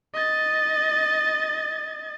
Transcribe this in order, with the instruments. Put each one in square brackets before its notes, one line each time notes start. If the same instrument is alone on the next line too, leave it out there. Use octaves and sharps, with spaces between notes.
[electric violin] D#5 A6